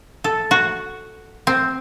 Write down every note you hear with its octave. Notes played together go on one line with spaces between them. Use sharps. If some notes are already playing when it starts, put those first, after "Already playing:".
A4
F#4
C4